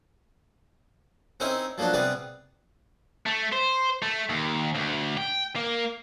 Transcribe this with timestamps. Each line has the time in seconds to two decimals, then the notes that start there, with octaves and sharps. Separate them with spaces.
1.40 C4 C#4 D#4 E4 A#4
1.78 F3 F#3 A#3 D4 F#4
1.93 C3 G3 B3 G#4 B4 D6
3.26 A3
3.53 C5
4.03 A3
4.29 D#2
4.75 D2
5.17 G5
5.56 A#3